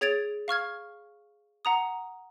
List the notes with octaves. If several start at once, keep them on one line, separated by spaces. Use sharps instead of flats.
G#4 C#5 G#6 A6 D7 F7
F5 C#6 F6 G#6
F#5 A#5 D#6